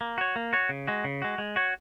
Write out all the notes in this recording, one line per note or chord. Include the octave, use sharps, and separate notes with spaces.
A#3
F#4 C#5
A#3
F#4 C#5
C#3
G#3 F#4
C#3
G#3 F#4
G#3
F#4 C#5